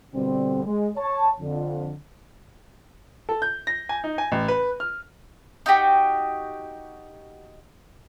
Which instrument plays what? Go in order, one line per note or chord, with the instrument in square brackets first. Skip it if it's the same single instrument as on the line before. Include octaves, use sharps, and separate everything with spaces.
[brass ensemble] B2 D3 G3 C4
G#3
C#5 A5
F2 D3
[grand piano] A4
G6
A#6
G#5
D#4
G#5
A1
B4
F6
[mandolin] D#4 F#4 G4